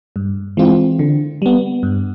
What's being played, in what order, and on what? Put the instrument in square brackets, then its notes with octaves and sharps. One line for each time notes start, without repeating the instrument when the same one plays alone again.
[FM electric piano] G2
E3 G#3 C4 F4
D3
G3 B3
G2